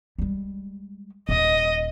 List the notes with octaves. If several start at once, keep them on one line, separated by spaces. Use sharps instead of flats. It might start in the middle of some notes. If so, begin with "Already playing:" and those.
G3 G#3
D#1 D#5